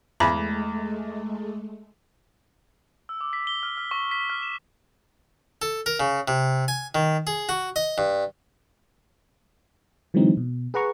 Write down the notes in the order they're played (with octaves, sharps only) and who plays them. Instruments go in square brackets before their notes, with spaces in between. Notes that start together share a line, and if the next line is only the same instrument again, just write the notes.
[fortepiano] E2 [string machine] G#3 A3 [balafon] B5
[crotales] E6
D6
B6
G7
F6
F6
C#6
B6
F6
E7
[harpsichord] A4
A#4
C#3
C3
G#5
D#3
G#4
F#4
D#5
G2
[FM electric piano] D3 E3 F#3 G#3 C4 D#4
B2
G#4 B4 F#5 A#5 C#6